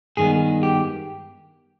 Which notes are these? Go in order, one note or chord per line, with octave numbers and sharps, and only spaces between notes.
G2 D#3 G#3 B3 G#4
G4